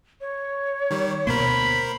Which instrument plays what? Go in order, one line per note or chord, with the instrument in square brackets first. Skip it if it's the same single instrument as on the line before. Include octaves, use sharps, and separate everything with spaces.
[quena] C#5
[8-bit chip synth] D#3 G3
[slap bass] D2 B2 A#3 [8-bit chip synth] A#4 C5 C6 [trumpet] B5